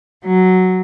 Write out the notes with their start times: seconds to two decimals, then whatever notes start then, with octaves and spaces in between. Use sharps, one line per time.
0.25 F#3